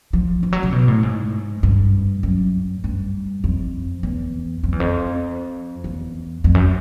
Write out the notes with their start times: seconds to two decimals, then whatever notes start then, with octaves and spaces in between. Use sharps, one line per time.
0.13 F3
0.43 F3
0.53 F#3
0.63 C#3
0.72 B2
0.88 A2
1.03 G#2
1.63 G2
2.23 F#2
2.84 G2
3.44 F2
4.03 E2
4.63 F2
4.72 E2
4.80 F2
5.84 E2
6.44 F2
6.55 F#2